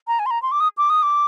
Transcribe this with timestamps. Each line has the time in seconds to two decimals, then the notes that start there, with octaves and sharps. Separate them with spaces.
0.08 A#5
0.19 G#5
0.26 C6
0.31 A#5
0.42 C6
0.52 D6
0.60 D#6
0.78 D6
0.90 D#6
1.03 D6